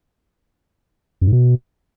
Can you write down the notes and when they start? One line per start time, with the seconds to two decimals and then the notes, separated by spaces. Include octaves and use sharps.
1.21 F#2
1.27 G#2
1.33 B2